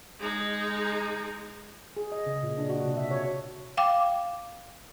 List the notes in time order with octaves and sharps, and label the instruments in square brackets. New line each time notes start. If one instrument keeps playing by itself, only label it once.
[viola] G#3 D#4
[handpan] G#4
D#5
C#3
A#2
D4
F#4
C3
E5
C#5
[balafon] F5 G5 D6